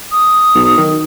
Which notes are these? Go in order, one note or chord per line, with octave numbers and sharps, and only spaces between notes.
D#6
B1
D#3